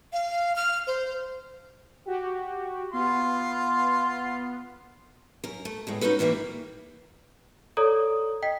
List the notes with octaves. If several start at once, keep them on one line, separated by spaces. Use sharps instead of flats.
F5
F6
C5
F#4 G4
B3 F4 C6
F#2 A#4
A3
E2 A2 G#3
C#4 D#4 F#4 A4 B4
A#2 E3 G3 G#3 A#3
A4 C#5 D5 A#5 D#6
D#5 G5 B6